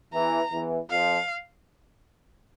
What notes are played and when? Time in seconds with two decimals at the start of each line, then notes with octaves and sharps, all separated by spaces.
0.13 E2 E3 A#5
0.51 E2 E3
0.90 F2 F3 F5